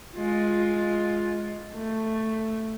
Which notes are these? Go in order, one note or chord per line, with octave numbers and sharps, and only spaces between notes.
G#3 F4
A3